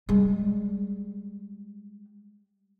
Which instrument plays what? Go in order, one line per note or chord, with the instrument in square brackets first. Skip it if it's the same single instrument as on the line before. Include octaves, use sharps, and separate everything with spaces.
[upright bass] G3 G#3